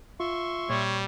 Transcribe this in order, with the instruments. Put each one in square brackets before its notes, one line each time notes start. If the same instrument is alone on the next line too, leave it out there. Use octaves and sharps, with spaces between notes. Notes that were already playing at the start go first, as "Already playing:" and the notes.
[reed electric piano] F4 [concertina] E5 C6 C#6
[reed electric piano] A#2 [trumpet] G3 [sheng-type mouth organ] C#5